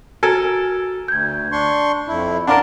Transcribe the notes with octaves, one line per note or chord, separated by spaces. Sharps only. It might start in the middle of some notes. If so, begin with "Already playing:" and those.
F#4 A4 A#4 G#5
D2 G6 G#6
D4 C6 C#6
F2 E4
D4 A#4 F5 F#5 A5 A#5 C6 D6